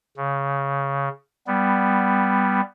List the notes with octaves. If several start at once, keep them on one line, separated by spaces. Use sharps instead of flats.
C#3
G3 B3